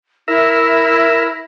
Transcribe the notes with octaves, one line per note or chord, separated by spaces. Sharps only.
E4 A#4 E5